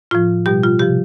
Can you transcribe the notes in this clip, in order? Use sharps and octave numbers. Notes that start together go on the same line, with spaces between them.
A2 F3 F4
B2 G3 G4
F4
C3 F3 G4